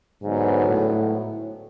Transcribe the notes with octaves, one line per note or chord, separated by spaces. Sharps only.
G#2 D3 F#3 B3
A2